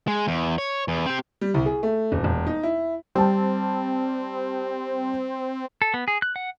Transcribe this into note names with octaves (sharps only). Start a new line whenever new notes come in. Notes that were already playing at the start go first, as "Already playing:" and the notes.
G#3
E2
C#5
E2
C4 G4
G3
C2
G#4
A3
D#1
E1
D#4
E4
G3 C4 A5
A4
B3
G#4
F#6
F#5